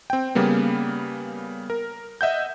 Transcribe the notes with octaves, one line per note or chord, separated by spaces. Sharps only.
C4 G5
C#3 G3 A#3 B3
A#4
D#5 E5 F#5 G6